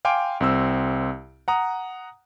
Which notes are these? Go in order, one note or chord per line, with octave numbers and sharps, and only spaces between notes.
F5 G5 G#5 C6 D6 D7
C2 C4 E6
F#5 A#5 D#6